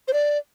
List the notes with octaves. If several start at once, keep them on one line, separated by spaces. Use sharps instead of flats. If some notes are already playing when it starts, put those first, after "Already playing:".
C5
D5